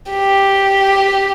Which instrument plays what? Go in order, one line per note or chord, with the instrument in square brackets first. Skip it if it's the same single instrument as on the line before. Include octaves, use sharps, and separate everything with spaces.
[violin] G4